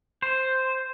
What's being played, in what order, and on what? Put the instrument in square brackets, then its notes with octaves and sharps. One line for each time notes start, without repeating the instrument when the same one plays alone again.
[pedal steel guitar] C5